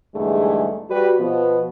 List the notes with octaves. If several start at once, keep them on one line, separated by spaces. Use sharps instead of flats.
E2 G#2 D3 G3 A3 G#4
G3 F#4 B4
B2 F3 B3